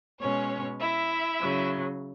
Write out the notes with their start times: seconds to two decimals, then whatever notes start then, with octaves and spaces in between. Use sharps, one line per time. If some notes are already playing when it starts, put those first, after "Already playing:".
0.20 B2 G#3 C#4 C#5
0.80 E4 E5
1.39 C#3 F#3